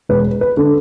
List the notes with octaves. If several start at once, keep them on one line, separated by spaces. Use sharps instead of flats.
E1 B4
B4
D3